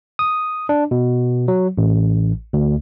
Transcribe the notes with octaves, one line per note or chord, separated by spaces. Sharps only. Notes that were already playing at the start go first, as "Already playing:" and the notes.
D#6
D4
B2
F#3
A1
D2